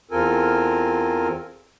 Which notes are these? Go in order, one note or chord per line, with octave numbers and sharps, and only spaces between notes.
E2 C4 F4 A4 A#4 G#5